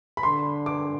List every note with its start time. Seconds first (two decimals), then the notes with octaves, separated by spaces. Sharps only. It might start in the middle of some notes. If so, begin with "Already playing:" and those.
0.17 B5
0.23 D3 C6
0.66 D6